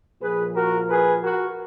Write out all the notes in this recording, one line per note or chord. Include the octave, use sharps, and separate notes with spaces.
A#2 F3 G#4 B4
F#4 A#4
G#4 B4
F#4 A#4